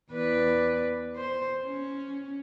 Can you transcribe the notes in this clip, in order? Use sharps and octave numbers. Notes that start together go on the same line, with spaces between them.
E2 B4 D5
C5
C#4